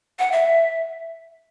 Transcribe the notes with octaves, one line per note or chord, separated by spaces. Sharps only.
F#5
E5